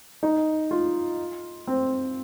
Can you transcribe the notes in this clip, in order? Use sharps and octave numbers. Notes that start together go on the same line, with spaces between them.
D#4
F4
C4